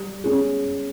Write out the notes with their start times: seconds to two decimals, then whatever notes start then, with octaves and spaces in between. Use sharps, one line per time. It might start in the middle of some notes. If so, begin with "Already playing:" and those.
Already playing: G3
0.24 C#4 G#4